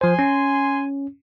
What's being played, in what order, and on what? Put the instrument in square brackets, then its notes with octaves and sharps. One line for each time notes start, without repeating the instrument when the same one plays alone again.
[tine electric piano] F3 C5 [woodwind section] G#5 C6
[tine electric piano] C#4